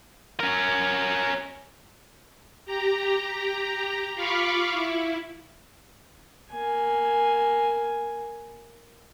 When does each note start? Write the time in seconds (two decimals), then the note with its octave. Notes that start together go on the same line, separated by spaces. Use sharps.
0.40 C#4 A#4
2.65 G4 A#5
4.15 F4 F5 B5 C#6 D6
4.70 E4
6.51 A#3 G#5